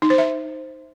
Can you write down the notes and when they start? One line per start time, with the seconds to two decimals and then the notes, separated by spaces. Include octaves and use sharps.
0.02 D#4
0.10 C5
0.18 E5